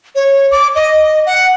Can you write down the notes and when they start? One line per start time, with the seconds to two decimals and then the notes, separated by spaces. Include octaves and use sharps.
0.15 C#5
0.51 D6
0.75 D#5
1.26 F#5